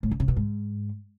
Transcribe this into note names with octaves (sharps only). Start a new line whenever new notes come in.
A2
D3
C3
B2
G#2